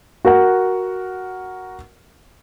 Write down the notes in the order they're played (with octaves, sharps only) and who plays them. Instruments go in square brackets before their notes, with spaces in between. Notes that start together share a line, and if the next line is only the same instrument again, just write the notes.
[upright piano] F#4 A#4 F#5